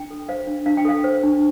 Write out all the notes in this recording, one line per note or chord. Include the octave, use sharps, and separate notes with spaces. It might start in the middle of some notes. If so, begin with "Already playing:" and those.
Already playing: D4 G5
A4
C5 F5
D4
D4 F5
G5
A4 F5
C5
D4